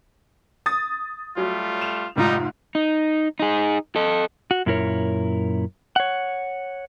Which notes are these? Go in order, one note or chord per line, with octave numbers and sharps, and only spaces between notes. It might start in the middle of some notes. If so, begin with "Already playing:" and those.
D#6 A6
F#3 G3 A3 F4
E7 F7
F1 G#2 G3 D#4 F4
D#4
D#4 G#4
A4 D#5
F#4
F#2 A#2 E4 A#4 C#5
C#5 F#5